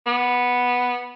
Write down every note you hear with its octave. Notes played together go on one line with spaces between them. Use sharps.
B3